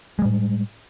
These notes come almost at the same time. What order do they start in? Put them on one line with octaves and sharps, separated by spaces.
G#3 G3 A2